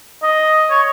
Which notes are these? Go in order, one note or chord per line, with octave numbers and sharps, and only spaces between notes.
D#5
C#5